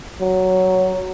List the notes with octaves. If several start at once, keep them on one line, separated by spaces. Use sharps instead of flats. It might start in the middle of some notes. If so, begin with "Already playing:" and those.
F#3